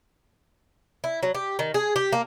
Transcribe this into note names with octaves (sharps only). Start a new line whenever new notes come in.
E4
F#3
G4
D#3
G#4
G4
A#3